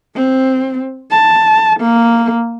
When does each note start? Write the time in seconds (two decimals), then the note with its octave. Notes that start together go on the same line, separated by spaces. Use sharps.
0.15 C4
1.10 A5
1.80 A#3